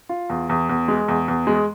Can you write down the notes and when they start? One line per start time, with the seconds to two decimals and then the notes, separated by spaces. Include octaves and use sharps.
0.09 F4
0.29 E2
0.49 E2
0.69 E2
0.88 G#3
1.08 E2
1.28 E2
1.47 G#3